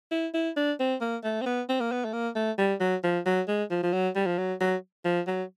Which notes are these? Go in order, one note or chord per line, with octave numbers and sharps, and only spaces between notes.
E4
E4
D4
C4
A#3
A3
C4
B3
C4
A#3
B3
A3
A#3
A3
G3
F#3
F3
F#3
G#3
F3
F3
F#3
G3
F3
F#3
F#3
F3
F#3